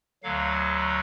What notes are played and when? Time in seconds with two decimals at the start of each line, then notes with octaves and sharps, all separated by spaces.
0.23 D2 D3 F#3 F5